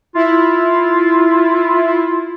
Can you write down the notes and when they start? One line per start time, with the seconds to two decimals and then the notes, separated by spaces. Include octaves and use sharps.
0.15 E4 F4